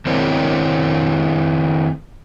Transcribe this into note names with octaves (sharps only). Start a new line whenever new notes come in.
D#3 C4 E4 A#4 C5 C#5